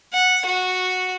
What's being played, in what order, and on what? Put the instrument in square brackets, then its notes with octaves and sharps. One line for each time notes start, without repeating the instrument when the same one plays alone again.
[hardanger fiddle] F#5
F#4